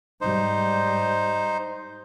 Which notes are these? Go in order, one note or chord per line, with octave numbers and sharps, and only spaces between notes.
G#2 G3 D#4 C5